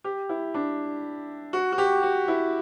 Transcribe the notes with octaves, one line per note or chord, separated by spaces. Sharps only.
G4
E4
D4
F#4
F#4
G4
F#4
E4